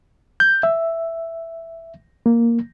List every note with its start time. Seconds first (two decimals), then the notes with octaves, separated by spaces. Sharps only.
0.40 G6
0.63 E5
2.26 A#3